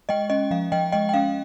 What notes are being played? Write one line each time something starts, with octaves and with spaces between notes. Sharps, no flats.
G#3 D#5 G5
C#4 D#5
F3 F5
F3 D#5 G5
G#3 D#5 G5
G5
C#4 F5